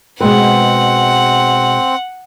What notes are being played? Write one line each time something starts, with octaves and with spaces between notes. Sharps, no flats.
B2 G#3 C4 B4 F#5